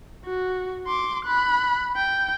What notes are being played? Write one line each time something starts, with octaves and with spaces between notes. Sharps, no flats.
F#4
C6 D6
B5 F#6
G5